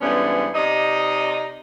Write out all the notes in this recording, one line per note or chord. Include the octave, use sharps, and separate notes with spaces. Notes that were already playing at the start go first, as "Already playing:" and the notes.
G#2 D3 E3 G3 B3 C#4
C3 D#4 D5 D#5